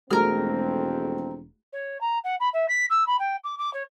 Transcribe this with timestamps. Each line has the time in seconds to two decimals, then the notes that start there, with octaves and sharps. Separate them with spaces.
0.11 E1 F2 G#3 A3 C4 F#4 A#4 F6
1.73 C#5
2.01 A#5
2.24 F#5
2.40 B5
2.53 E5
2.69 B6
2.90 E6
3.07 B5
3.19 G5
3.44 D6
3.58 D6
3.74 C#5